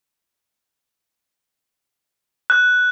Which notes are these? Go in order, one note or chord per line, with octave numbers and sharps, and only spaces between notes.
F#6